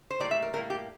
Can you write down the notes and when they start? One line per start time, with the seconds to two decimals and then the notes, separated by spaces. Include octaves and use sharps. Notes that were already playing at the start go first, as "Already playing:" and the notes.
0.10 C5
0.20 A2 G3 A#3 D5
0.31 E5
0.42 A#4
0.54 A2 G3 A#3 A#4
0.70 G4